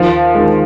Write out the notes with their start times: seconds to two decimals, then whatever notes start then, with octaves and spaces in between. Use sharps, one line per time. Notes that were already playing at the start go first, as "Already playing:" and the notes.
Already playing: D#2 F3
0.35 D#3 G#3